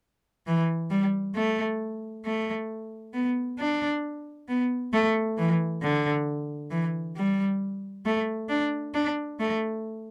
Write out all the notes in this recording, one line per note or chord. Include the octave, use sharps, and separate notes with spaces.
E3
G3
A3
A3
B3
D4
B3
A3
E3
D3
E3
G3
A3
D4
D4
A3